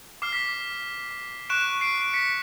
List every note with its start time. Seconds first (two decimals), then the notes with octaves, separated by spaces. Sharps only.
0.22 D6 F6 C7
0.33 B6
0.44 C7
1.50 C#6 F#6 D7 E7
1.81 C7 D7
2.02 D7
2.13 B6 C#7